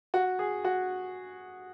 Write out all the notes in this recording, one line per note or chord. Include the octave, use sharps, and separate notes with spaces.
F#4
G#4
F#4